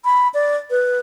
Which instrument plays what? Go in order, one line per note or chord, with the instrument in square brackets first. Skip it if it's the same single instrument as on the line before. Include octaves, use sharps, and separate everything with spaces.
[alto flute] B5
D5
B4